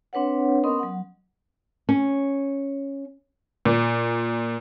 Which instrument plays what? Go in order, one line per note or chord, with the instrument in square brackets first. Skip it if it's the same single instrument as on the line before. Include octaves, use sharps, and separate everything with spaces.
[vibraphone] C4 D4 B4 C#5 F#5
B3 C#4 A#4 D#5 C6 D#6
F#3 F#5
[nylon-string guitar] C#4
[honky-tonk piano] A#2